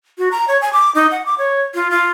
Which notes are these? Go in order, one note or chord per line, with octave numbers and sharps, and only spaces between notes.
F#4
A#5
C#5
G#5
D6
D#4
F#5
D6
C#5
F4
F4